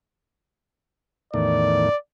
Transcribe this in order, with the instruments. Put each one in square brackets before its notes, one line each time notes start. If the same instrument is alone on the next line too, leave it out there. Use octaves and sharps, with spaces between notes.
[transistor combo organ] E2 A2 D#3 [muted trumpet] D5